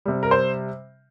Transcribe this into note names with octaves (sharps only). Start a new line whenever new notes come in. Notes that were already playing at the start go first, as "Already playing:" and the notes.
C3 G3
A#4
C5